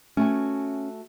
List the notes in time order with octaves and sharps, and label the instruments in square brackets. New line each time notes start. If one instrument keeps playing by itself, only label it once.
[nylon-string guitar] A3 F#4 G#5 [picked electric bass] C#4